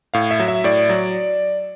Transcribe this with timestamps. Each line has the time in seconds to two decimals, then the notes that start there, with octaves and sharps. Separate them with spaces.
0.14 A2 F5
0.31 E5
0.40 F#3
0.48 E5
0.64 A2 D5
0.89 F#3